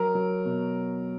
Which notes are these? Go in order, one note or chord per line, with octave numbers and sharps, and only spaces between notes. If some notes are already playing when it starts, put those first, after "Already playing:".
Already playing: F#3 A#4
F#3
B2